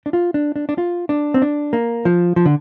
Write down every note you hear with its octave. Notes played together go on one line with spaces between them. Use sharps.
D4
F4
D4
D4
D4
F4
D4
C4
D4
A#3
F3
F3
D3